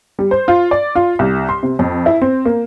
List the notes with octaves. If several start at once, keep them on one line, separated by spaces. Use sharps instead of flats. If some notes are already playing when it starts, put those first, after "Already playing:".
G3
C5
F4
D5
F4
C2
C6
C3
F2
E4
C4
A#3